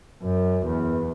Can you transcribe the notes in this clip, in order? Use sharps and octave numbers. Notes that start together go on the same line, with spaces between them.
F#2
E2